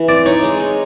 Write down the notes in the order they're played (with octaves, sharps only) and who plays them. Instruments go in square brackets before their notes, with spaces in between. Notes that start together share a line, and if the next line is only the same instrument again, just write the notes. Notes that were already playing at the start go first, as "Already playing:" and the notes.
Already playing: [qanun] E3
[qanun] C4 [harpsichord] D5
[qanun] D#4 [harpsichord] C#5
[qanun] G#3
D#4